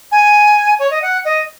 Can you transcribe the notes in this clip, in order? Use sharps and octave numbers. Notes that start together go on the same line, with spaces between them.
G#5
C#5
D#5
F#5
D#5